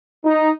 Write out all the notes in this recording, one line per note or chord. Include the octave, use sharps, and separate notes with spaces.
D#4